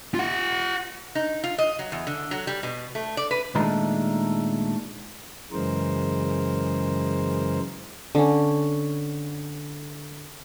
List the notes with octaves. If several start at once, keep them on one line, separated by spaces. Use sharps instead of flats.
F4 F#5
D#4
F4
D#5
F#3
E2
D3
F#3
G3
B2
A3
D5
B4
A#2 D#3 G#3 A3 D4 A#5
F#2 C#3 E3 G#3 A#4 C5
D3 C#4